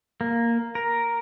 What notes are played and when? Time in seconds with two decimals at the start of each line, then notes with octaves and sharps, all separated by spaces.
0.21 A#3
0.75 A#4